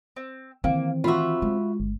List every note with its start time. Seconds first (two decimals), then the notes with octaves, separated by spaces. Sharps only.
0.16 C4
0.64 D#3 E3 A#3 C4
1.04 F4 F#4 E5 B5
1.42 G#3
1.80 G1